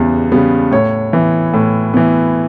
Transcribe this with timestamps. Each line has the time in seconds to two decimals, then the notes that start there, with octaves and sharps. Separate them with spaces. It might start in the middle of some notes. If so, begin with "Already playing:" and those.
Already playing: E2 C#3 G3 B3
0.32 C#3 G3 B3
0.72 A2 C#5
1.13 E3 B3
1.54 A2
1.94 E3 B3